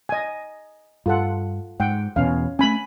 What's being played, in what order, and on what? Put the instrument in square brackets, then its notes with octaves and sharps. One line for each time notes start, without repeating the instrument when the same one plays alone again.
[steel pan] D#5 G#5
[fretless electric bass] G2 [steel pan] F4 A4 F#5
[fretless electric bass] G#2 [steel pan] F#5 G5
[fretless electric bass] E2 B2 [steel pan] C#4 F5
[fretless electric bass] A3 C#4 [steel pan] G#5 B5